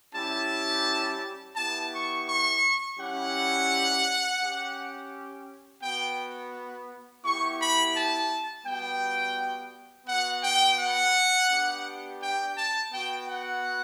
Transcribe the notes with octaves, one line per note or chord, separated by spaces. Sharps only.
G3 C#4 E4 G4 A5
B3 E4 G4 A5
C#6
C#6
G3 C#4 E4 G4 F#5
C#4 G4
B3 F#4 G5
B3 E4 G4 C#6
B5
A5
G3 B3 F#4 G5
B3 F#4 F#5
G5
F#5
B3 D4 G4
G5
A5
B3 F#4 G5
F#5